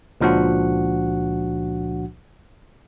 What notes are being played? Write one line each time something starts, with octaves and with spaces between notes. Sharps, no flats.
C#2 A#2 F3 D4 F#4 F#5